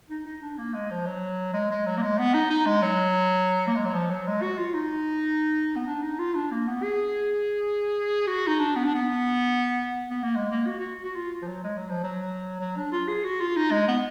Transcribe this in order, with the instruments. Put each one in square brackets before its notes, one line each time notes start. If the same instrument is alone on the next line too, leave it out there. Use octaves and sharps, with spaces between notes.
[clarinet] D#4
D#4
D4
A#3
G#3
F3
F#3
G#3
G#3
F#3
A#3
G#3
B3
D#4
D#4
G#3
F#3
A#3
G#3
F#3
F3
F#3
G#3
F#4
F4
D#4
B3
D4
D#4
F4
D4
A#3
B3
G#4
F#4
D#4
D4
B3
D4
B3
B3
A#3
G#3
A#3
F#4
F#4
F#4
F4
F3
F#3
G#3
F#3
F3
F#3
F#3
D4
F4
G#4
F#4
F4
D#4
G#3
B3